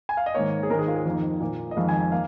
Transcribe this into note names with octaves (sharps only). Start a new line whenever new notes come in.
G#5
F5
D#5
G#2 D#3 A#3 C#5
G#4
G#2 D#3 G#3 A#4
G#4
F4
G#4
F2 D#3 A#3
A#2 A#3
D#5
F2 D#3 G#3 F5
G#5
G#5
A#3 F5